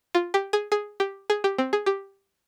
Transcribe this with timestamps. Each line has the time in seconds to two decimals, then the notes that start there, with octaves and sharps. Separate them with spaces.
0.15 F4
0.34 G4
0.53 G#4
0.72 G#4
1.00 G4
1.30 G#4
1.44 G4
1.58 C4
1.73 G#4
1.86 G4